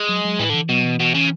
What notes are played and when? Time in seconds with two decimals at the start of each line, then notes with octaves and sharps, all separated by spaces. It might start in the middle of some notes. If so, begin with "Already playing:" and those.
Already playing: G#3
0.09 F#3
0.25 F#3
0.39 A2 E3
0.50 D3 E3
0.69 B2 F#3
0.84 E3
1.00 B2
1.14 C#3